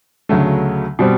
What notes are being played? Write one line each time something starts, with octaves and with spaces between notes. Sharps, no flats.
D2 C#3 F#3 A3
B2 G3 C4